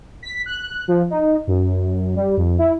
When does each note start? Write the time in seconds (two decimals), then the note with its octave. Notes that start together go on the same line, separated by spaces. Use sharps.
0.23 B6
0.46 F#6
0.88 F3
1.10 D#4
1.47 F#2
2.16 G3
2.37 F2
2.58 E4